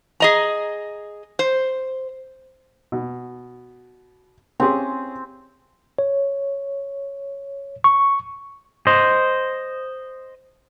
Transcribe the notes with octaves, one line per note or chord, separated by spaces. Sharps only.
G#4 D#5 A#5
C5
B2
C4 C#4 G4 G#4
C#5
C#6
C5 D#5